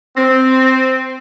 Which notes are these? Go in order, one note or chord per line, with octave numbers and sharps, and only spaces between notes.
C4